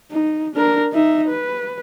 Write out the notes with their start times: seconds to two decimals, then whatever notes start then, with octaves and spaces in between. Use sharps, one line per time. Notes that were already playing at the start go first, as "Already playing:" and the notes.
0.11 D#4
0.55 D4 A#4
0.93 D#4 E5
1.28 B4